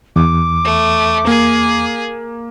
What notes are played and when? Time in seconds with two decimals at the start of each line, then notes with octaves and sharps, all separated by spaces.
0.16 E2 D6
0.65 A3
1.27 A#3 G#4